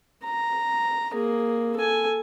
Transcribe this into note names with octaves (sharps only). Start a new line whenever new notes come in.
A#5
A#3 G#4
A4 G#5